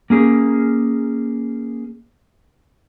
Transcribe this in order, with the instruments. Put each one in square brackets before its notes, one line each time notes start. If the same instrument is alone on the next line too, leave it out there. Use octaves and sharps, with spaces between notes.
[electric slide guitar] A#3 C#4 G#4